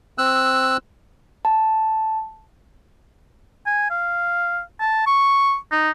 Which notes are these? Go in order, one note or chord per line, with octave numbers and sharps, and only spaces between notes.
C4 E6 F#6
A5
G#5
F5
A5
C#6
D#4